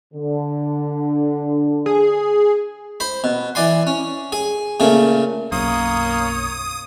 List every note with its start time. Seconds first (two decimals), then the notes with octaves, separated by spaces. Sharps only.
0.14 D3
1.86 G#4
3.00 C5 B5
3.24 B2
3.55 E3 D5 G#5 C6
3.87 C#4
4.32 G#4 G#5
4.80 A#2 C#3 A3 G#4
5.52 B1 F#2 A#3 C#5 D#6